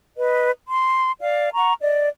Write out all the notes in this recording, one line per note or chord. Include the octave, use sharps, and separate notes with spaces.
B4 D#5
C6
D5 F5
F#5 A#5 C#6
D5 D#5